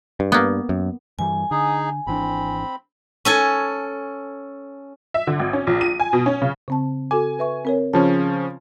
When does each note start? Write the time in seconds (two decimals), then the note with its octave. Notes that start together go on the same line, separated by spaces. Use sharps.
0.20 G2
0.32 A#3 B3
0.69 F#2
1.19 G2 E3 G3 G#5
1.51 D3 D#4 G#4
2.07 G#1 E3 C4 D4 B5
3.25 C#4 A4 G#5
5.14 E5
5.27 D3
5.39 G#1
5.53 C#4
5.67 A#1
5.81 D#7
6.00 G#5
6.13 B2
6.26 C#4
6.42 C#3
6.68 C#3 C4 A5
7.11 F#4 A4 G#5 D6
7.39 B4 E5 C#6
7.65 C4 A#4 C#5
7.93 C#3 F3 C#4 A5